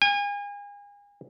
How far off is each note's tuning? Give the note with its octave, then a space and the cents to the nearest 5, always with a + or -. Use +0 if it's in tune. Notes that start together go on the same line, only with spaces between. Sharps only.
G#5 -35